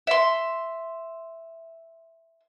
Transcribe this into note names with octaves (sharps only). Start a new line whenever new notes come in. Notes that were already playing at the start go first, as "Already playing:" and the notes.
E5 C6